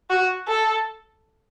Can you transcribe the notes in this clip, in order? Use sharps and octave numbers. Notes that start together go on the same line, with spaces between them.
F#4
A4